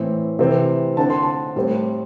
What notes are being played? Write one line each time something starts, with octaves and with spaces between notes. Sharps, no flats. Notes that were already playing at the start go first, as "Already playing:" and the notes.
Already playing: A2 E3 C4
C3 E3 C4
D3 C4 A5
C6
A5
A2 G3 C4